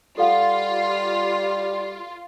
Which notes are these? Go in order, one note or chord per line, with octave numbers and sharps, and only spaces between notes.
G3 F4 A4 F5 F#5